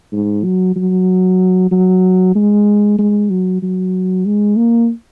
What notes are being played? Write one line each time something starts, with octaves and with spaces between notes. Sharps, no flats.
G#2
F#3
F#3
F#3
G#3
G#3
F#3
F#3
G#3
A#3